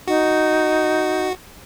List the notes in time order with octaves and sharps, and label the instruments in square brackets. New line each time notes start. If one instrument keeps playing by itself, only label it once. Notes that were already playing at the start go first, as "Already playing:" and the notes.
[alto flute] D#4 [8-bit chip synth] F#4